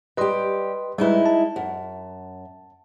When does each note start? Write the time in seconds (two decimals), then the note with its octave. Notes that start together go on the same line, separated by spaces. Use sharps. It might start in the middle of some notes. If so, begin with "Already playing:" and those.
0.17 G3 G4 B4 D#5 C6
0.98 G3 G#3 D#4 E4 B4
1.26 A5
1.56 F#2